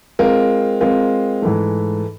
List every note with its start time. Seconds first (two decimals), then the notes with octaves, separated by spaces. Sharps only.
0.19 G#3 C4 F4 A#4
0.81 G#3 C4 F4 A#4
1.42 G#2 E3 A3